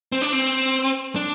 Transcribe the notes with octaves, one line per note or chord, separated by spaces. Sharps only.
C4
D4
C4
D4